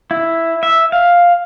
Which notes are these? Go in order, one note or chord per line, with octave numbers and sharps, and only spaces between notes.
E4
E5
F5